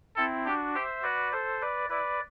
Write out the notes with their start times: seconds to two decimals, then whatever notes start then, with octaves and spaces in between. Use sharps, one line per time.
0.16 C4 E4 A4
0.45 D4 F#4 G4
0.75 G4 C5 E5
1.03 F#4 B4 D5
1.32 A4 C5
1.62 B4 D5
1.90 E4 B4 D5